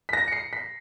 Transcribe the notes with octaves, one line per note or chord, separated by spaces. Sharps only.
B6
A#6
C#7
C7
B6